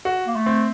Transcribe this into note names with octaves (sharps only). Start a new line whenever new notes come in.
F#4
A#3
A3
C4